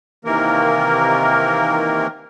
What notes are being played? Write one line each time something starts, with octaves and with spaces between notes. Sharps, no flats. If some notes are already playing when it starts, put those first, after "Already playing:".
C3 D#3 E3 A#3 A#4